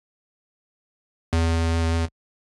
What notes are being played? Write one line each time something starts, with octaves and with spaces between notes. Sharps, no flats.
E2